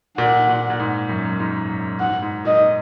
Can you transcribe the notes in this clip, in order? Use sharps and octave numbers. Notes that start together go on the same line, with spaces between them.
A#2 F#5
A#2
A#2
G#2
F#2
G#2
F#2
G#2 F#5
G#2
A#2 D#5